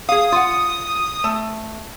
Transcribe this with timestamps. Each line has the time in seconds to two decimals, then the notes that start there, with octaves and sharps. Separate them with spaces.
0.09 G#4 F5 D#6
0.32 F4 F#5
1.24 A3